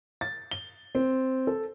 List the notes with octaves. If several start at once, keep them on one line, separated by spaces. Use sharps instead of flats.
A6
G7
C4
A4